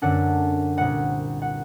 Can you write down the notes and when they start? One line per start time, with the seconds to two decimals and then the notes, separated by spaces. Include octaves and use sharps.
0.02 F#2 D3 F#3 A3 D4 F#5
0.77 C2 A#2 G3 F#5
1.42 F#5